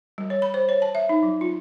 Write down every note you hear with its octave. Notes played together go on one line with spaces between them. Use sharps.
G3
C#5
B5
C5
C#5
A5
E5
D#4
F#3
F4